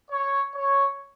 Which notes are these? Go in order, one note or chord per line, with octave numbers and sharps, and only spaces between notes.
C#5
C#5